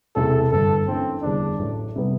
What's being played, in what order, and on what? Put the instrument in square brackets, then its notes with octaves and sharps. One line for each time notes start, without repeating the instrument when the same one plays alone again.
[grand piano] E1 E2 C3 E3 A3 [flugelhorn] A4
[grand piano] G1 G2 D3 [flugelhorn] A4
[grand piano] F#2 E3 A3 D4 [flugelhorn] C4
[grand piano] F#1 E2 D3 G3 [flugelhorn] D4
[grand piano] A1 A2 F#3 A3
C3 G3 B3